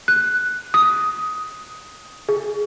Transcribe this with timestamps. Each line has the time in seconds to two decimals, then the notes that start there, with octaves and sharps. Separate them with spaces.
0.08 F#6
0.74 D#6
2.29 G#4